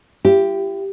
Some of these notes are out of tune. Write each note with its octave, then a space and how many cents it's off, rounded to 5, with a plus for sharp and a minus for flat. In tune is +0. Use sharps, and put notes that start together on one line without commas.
E4 +45 G4 +0